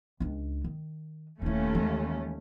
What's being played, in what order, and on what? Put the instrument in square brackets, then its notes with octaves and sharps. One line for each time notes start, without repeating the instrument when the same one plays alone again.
[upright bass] C#2 D4
D#3
[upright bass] D#1 E4 [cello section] D#2 A3 C#4
[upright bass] E3 G#3